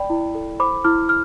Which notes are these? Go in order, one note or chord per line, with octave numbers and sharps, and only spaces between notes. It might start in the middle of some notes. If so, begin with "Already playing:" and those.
Already playing: D5 G5 B5
E4
A4
C5 B5 D6
E4 D6 F6
F6